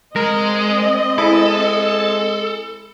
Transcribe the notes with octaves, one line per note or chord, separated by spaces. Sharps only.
G#3 C4 A#4 D#5
G#3 E4 A4